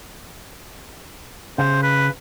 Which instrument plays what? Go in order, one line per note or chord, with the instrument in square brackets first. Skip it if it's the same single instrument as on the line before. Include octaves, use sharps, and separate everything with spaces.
[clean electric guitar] C#3 [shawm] C5
[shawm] B4